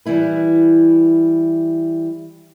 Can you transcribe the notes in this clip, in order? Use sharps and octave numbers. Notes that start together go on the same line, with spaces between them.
E3 G3 E4 B4